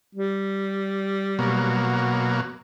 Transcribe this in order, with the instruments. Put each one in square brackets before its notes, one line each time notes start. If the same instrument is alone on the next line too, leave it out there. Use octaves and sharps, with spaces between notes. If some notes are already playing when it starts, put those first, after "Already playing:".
[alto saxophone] G3
[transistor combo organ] B2 F#3 A#3